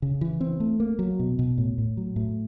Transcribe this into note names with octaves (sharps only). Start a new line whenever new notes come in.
C#3
E3
C4
A3
A#3
F#3
B2
B2
A2
A2
F#3
A2